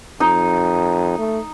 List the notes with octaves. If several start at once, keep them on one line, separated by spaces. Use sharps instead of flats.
F2 D#4
A3